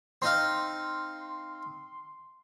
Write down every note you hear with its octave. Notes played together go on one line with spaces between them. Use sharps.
C4 D#4 F5 C6